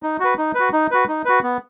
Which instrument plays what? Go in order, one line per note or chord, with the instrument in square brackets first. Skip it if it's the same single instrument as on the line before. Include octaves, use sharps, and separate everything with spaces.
[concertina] D#4
F#4 B4
D#4
F#4 B4
D#4
F#4 B4
D#4
F#4 B4
B3